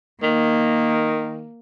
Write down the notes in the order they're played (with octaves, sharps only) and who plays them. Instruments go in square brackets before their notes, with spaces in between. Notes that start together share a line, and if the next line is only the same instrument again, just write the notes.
[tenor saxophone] D#3 [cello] A#3